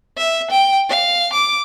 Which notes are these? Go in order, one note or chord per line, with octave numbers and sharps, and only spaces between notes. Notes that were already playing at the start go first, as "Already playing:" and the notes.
E5
G5
F5
D6